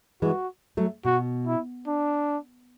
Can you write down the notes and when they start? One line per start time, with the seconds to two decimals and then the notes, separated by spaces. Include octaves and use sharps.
0.22 E3 G#3 F#4
0.77 F#3 A3
1.05 B2 F#4
1.47 E4
1.88 D4